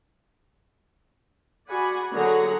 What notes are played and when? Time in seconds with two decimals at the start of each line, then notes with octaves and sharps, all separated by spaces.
1.68 F#4 G#4 D5 F#5 G#5 B5
2.13 D3 F#3 G#4 C#5 F#5 A#5